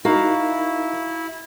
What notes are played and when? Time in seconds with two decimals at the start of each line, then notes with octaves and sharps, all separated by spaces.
0.05 D#4 E4 F#4 A#4 F5 A#5